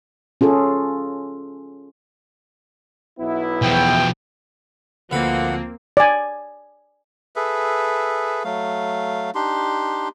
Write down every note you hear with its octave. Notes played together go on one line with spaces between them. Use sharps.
C#4 F4 G#4 A4
B1 B3 E4
E2 B2 F3 G5
D2 F3 A#3 C4 B4 F#5
D5 G#5
G#4 A4 B4 E5
F#3 A3 F5
D4 D#4 G4 C6